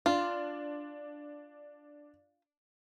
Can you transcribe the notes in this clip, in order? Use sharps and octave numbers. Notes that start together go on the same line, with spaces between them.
D4 F4